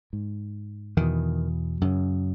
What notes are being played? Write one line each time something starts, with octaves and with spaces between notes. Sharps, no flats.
G#2
E2 B2 D#3
F#2 C#3